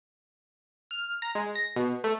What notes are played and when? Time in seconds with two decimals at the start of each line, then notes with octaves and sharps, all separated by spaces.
0.91 F6
1.22 A#5
1.35 G#3
1.55 A#6
1.76 B2
2.04 A3